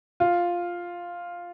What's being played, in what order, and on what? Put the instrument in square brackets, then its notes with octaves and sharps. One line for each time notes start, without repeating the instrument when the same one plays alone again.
[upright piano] F4